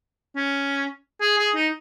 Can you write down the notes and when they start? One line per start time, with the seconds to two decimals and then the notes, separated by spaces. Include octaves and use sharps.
0.36 C#4
1.21 G#4
1.38 G#4
1.55 D#4